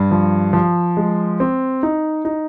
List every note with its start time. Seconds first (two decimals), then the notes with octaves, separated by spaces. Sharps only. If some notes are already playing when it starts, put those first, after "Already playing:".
Already playing: G2
0.11 F3
0.53 F3
0.97 G#3
1.40 C4
1.83 D#4
2.25 D#4